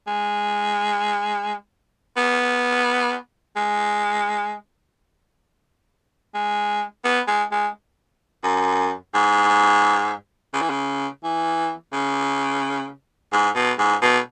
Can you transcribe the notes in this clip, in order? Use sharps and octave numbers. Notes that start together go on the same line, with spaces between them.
G#3
B3
G#3
G#3
B3
G#3
G#3
F#2
G#2
C#3
E3
C#3
E3
C#3
G#2
B2
G#2
B2